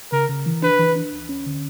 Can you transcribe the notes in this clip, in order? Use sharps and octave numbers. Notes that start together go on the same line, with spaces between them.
C#3 A#4
C#3
E3
D4 B4
E3
D4
D2
C#4
D3